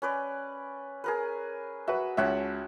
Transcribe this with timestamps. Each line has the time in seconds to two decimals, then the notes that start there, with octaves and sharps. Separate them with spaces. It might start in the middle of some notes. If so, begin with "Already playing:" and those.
0.02 C#4 B4 D5
1.04 G#4 A#4 B4
1.88 F#4 B4 E5
2.17 C#2 C#5 E5 F#5 A5